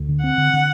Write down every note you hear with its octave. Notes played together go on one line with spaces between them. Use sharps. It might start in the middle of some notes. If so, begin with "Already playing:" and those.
Already playing: D2
D3
C4 F#5
D3
D3